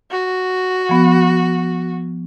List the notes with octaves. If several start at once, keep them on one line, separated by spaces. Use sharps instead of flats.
F#4
F3 B3